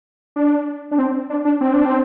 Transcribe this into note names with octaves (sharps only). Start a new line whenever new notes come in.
D4
D4
C4
D4
D4
C4
D4
C4